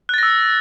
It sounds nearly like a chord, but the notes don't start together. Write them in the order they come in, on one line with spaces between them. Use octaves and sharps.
F#6 A6 A#6 E6